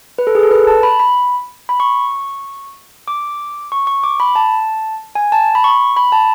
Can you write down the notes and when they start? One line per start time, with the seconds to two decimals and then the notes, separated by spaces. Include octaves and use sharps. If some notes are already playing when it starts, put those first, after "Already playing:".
0.18 B4
0.27 A4
0.35 G#4
0.43 A4
0.51 B4
0.67 A5
0.83 B5
1.00 B5
1.69 B5
1.80 C#6
3.08 D6
3.72 C#6
3.87 C#6
4.04 D6
4.20 B5
4.35 A5
5.15 G#5
5.32 A5
5.55 B5
5.64 C#6
5.97 B5
6.12 A5